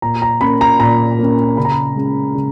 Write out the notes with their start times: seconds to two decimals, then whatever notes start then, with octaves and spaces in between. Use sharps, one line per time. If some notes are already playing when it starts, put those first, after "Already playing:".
0.02 A#2 A#5
0.22 A#5
0.41 A#3 C#4 B5
0.61 A#5
0.80 A#2 A#5
1.19 A#3 C#4
1.57 C#3 B5
1.65 A#5
1.72 B5
1.96 G#3 C#4
2.35 C#3